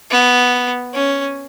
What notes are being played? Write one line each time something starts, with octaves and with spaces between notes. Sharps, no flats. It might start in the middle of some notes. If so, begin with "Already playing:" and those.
B3
C#4